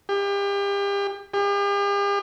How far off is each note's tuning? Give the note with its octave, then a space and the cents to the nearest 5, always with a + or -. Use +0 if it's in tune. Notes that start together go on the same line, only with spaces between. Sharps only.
G4 +35
G4 +45